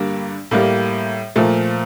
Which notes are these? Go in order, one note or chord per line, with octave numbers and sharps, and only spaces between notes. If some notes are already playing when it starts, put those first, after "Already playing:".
Already playing: G2 D3 G3 A#3
A2 G3 A#3
A#2 F3 A3